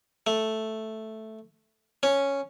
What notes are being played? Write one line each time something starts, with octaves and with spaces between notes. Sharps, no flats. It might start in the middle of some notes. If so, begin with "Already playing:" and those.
A3
C#4